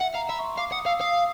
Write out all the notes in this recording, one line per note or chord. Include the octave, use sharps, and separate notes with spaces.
E5 F#5
F5 A#5
E5 B5
C#6
C6
F5 D6
F#5 D#6
F5 E6
F5 D#6